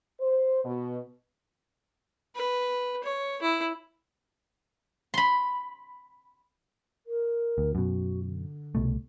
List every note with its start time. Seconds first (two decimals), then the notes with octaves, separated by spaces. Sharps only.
0.20 C5
0.65 B2
2.35 B4
3.04 C#5
3.42 E4
5.14 B5 C6
7.06 A#4
7.58 D2
7.75 F#2 B2 F#4
8.24 D3
8.75 C2 B2 A3